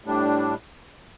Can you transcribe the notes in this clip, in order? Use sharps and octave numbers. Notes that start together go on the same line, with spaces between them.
A2 G3 D4